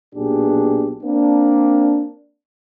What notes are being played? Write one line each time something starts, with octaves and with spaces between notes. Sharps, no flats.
B1 A#2 D4 G4 G#4
A#3 C4 D4